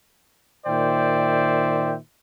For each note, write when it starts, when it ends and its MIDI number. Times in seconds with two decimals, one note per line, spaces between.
0.66 1.95 46
0.66 1.95 51
0.66 1.95 72
0.66 1.95 74
0.66 1.95 76
0.66 1.95 79